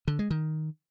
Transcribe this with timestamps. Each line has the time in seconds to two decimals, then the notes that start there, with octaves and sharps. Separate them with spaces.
0.08 D3
0.19 G#3
0.31 D#3